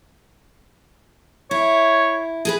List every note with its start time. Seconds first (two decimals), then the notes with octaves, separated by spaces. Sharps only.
1.51 E4 C#5
2.45 G#4 A4 B4